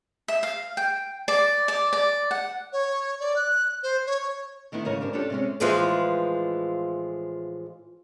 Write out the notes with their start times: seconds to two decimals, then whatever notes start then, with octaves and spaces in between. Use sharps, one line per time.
0.28 E5
0.43 F5
0.77 G5
1.28 D5
1.68 D5
1.93 D5
2.31 F#5
2.73 C#5
3.20 D5
3.36 F#6
3.83 C5
4.06 C#5
4.21 C#5
4.72 D3 D#3 A3 B3 E4
4.85 G#2 C#3 A#4 C#5
5.01 D4 G4 C5
5.13 C#4 D4 F4 G4 A4
5.30 C3 G#3 C#4
5.60 A2 E3 F3 G#3 F4 B4